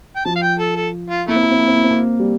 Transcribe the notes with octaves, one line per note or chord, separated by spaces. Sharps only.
G5
F3 A5
F5
G5
A4
A4
F4
A3 A#3 E4
C4
A#3
C4
A#3
C4
A#3
C4
A#3
G3